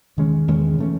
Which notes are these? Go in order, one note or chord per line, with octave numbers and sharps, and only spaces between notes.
E2 D#3 G#3 C#4
E2 D#3 G#3 C#4
C#3 E3 A3 C#4